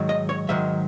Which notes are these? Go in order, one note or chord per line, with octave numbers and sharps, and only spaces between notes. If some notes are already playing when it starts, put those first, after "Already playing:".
Already playing: G#2 D#3 F#3
D#5
C#5
G#2 D#3 F#3 E5